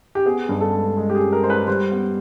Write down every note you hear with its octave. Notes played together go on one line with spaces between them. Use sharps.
G4
B3 G#4
G2
A4
G#3
G#3
G4
G#4
G#3
A#4
G#3 C5
B4
G3 C5
B3